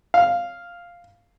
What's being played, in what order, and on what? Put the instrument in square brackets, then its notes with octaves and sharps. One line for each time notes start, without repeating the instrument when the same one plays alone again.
[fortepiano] F5